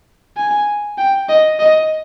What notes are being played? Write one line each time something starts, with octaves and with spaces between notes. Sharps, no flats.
G#5
G5
D#5
D#5